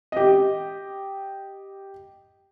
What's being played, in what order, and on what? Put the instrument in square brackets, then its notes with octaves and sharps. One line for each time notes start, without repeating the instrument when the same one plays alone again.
[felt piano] G4 D#5